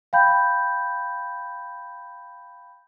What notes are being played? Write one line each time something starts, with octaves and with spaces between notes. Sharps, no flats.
F5 G5 B5 G6